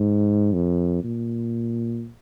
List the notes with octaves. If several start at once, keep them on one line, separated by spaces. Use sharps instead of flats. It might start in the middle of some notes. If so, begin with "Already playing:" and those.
Already playing: G#2
F2
A#2